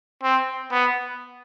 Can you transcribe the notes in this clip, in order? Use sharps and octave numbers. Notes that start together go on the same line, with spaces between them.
C4
B3